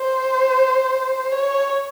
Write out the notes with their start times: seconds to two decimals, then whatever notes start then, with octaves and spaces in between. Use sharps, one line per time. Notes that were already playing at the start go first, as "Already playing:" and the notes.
Already playing: C5
1.32 C#5